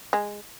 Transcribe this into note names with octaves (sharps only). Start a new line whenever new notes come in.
G#3